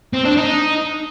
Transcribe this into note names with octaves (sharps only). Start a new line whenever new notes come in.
C4
D4
D#4